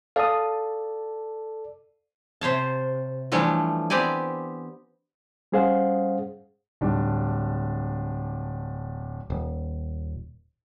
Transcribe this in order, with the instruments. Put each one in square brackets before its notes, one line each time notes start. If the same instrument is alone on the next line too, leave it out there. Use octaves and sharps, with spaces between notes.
[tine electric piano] A4 D5 [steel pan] F5 A5 D#6
[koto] C3 C5 C#5 A5
E3 F3 G3 A3 D4 C#5
B3 C4 G4 D5 G#5
[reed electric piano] G3 C#4 G#4 C5 F5 F#5
[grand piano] D1 G3 D4
[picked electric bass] D#1